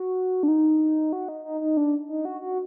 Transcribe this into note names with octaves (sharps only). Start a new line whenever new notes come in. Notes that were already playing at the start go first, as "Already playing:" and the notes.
Already playing: F#4
D4
D#4
F#4
D#4
D#4
D#4
D4
D#4
F#4
F#4